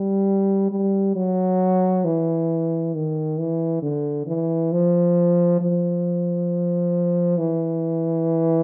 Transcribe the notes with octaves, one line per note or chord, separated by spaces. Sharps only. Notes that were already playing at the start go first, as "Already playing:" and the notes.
Already playing: G3
G3
F#3
E3
D#3
E3
D3
E3
F3
F3
E3